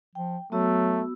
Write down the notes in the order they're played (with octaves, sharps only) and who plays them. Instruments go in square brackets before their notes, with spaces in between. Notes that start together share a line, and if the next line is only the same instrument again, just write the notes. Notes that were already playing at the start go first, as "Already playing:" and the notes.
[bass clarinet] F3 [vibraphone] G5
[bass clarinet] F#3 [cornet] A3 [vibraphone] B3 F#4 E6